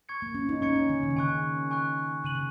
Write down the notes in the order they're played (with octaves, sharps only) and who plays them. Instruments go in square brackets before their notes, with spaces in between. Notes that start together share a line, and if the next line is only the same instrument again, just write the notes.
[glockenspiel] C#6 G#6 C#7
[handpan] A#3
C#4
D#4
[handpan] C#4 [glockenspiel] C#6 G#6 C#7
[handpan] C#4
D#3
C#3
D#3
[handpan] C#3 [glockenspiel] G#5 C#6 F#6
[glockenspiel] G#5 C#6 F#6
[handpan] C#3 [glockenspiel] F#6 D#7 F#7
[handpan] C#3